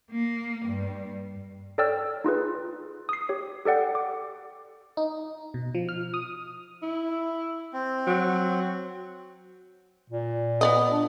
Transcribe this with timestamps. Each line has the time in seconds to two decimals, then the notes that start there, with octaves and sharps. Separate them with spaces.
0.11 A#3
0.65 G2
1.78 A4 C#5 D5 G5 E6 F6
2.24 D#4 F4 G#4 B4
3.09 D#6 C7
3.29 G4 C#5
3.65 G4 A4 D5 F#5 G5
3.95 D6
4.97 D#4
5.54 B2
5.75 F3
5.89 F6
6.14 D#6
6.82 E4
7.73 C4
8.06 F#3
10.10 A#2
10.61 B3 D5 D#5
10.92 D4